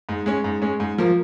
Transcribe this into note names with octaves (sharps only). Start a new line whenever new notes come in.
G#2
G#3 C#4
G#2
G#3 C#4
G#2
F3 A#3